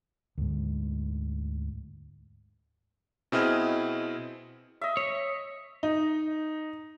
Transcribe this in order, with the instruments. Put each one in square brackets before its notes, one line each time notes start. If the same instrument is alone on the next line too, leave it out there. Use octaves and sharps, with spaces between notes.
[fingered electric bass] D2 G#2
[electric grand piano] B2 C4 E4 G#4 D#5 F6
[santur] D#5 E5
[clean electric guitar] C#5
[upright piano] D#4